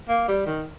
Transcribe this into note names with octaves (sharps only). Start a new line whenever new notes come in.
A#3
G3
D#3